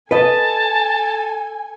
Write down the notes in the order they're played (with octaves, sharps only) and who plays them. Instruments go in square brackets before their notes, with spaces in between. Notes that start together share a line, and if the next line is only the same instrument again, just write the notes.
[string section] A4 G#5 [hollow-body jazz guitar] B4 D#5 [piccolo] A5